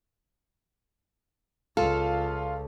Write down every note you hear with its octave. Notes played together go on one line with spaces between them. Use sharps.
C#2 F4 A4 F5